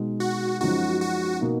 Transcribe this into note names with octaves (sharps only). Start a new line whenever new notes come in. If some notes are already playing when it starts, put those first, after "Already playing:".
Already playing: B2 G#3 D#4
F#4
F#2 F3 G#3 D#4 F#4
F#4
B2 A#3 D#4